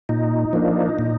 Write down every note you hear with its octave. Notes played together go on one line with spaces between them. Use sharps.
A#2 D#4
F3 A#3 D4
A#2